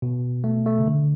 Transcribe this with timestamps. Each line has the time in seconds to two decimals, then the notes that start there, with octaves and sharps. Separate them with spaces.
0.02 B2
0.44 A3
0.66 A3
0.79 C#3
0.87 D3